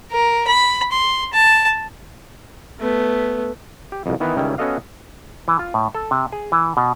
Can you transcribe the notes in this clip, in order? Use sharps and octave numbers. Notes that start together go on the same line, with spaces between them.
A#4
B5
C6
A5
A3 B3
G4
C2 F2
D#3 E3 B3 B4 D#5
C#2 D#3 G3 C#4 E4
B3 C#4 F#4 A4 D#5 F5
E3
F4
A2
A4
C3
G#4
E3
B2